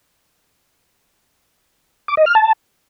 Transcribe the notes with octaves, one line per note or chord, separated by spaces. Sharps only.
D6
D#5
F6
A5